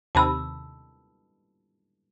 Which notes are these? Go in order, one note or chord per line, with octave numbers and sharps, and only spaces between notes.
D#2 C3 D#3 A5 B5 E6